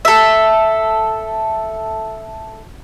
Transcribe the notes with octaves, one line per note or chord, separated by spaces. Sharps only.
A4 E5